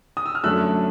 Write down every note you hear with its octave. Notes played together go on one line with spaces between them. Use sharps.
D#6
E6
F6
F#2 D3 F#3 A3 C#4 E6 F#6